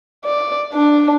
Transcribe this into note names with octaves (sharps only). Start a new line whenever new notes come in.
D5
D4